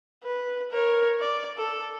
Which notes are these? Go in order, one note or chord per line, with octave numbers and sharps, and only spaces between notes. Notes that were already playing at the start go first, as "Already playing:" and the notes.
B4
A#4 C#5
D5
A4